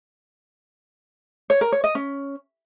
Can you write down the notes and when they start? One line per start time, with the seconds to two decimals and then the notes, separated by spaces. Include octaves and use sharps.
1.50 C#5
1.61 A#4
1.72 C#5
1.84 D#5
1.95 C#4